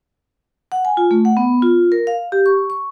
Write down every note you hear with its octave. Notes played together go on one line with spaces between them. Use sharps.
F#5
G#5
F4
A3
F#5
B3
F4
A#4
F5
G4
C#6
C#6